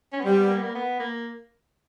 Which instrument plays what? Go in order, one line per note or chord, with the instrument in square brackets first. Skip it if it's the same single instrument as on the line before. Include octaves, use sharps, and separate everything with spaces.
[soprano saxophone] C#4
B3
[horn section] G3 [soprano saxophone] C4
[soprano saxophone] B3
A#3
B3
A#3
B3
A#3